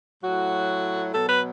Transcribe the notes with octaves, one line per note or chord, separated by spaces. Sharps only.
A2 F#3 F#4
B2 F#3 A4
B4